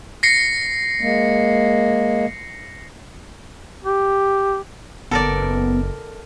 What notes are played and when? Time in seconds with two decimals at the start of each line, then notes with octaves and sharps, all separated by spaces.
0.23 A#6 C7 C#7
1.01 G#3 A#3
3.85 G4
5.11 F#1 B3 A4 A#4 D5